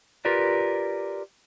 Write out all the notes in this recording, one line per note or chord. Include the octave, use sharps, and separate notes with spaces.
F4 G4 A#4 B4 D5